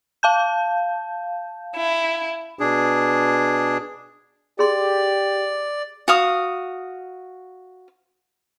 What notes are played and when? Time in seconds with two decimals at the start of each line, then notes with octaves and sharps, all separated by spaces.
0.23 F5 A5 G6
1.76 E4
2.59 B2 D4 G#4
4.59 G4 G#4 D5 C6
6.08 F#4 F5 D#6